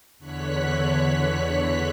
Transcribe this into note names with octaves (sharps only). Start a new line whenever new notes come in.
E2 D3 C#5 F#6 B6